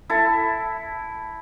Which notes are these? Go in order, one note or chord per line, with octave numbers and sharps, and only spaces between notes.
E4 A4